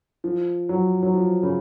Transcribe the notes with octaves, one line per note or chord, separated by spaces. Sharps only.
F3
F#3
F#3
F3
C#3